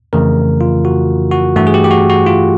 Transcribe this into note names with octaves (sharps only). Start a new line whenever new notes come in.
F2 C#3 E3 A3 A#4
F4
F#4
F#4
G2 E3 A3 F#4
G#4
G4
G4
F#4
F#4
F4